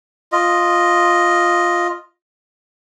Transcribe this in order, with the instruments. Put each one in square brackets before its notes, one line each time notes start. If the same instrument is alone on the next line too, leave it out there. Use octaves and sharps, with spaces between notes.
[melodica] F4 D#5